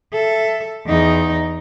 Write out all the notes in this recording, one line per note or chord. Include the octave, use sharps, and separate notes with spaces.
A4 E5
E2 D#4